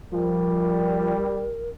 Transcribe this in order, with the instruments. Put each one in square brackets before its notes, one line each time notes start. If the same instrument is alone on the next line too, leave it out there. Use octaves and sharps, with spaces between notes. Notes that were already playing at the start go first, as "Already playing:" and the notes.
[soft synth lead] F3 [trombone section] G3 [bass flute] A#4